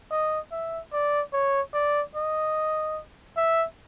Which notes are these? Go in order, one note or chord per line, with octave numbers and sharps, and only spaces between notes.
D#5
E5
D5
C#5
D5
D#5
E5